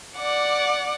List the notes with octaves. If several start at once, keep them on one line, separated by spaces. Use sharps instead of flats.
D5 F#5 D6